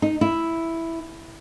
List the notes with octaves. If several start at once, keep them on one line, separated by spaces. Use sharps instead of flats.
D#4
E4